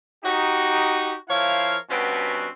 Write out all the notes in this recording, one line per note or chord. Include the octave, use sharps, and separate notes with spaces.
D#4 F#4 G4
F3 E4 A#4 C#5 F5
G2 B2 C4 C#4 F#4 B4